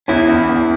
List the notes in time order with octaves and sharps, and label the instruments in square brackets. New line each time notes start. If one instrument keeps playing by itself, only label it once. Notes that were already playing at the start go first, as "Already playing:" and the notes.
[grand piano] E2 [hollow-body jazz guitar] C#4 E4
[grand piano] E2
E2